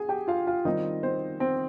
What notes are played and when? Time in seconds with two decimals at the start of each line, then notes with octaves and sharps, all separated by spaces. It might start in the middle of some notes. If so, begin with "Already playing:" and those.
Already playing: G#4 G#5
0.09 G4 G5
0.27 F4 F5
0.47 F4 F5
0.65 D#3 G3 C4 D#4 F4 D#5
1.03 C4 C5
1.40 C4 C5